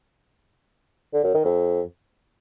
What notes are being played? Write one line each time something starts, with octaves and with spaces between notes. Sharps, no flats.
D3
F#2
D#3
F2